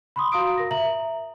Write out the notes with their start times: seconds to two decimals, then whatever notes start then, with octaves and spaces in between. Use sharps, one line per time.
0.16 B5 C6 D#6
0.32 F#4 F5 A#5 C6 D#6 D7
0.57 A#4 A#6
0.71 E5 A#5 F#7